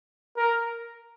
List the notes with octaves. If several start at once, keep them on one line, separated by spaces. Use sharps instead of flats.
A#4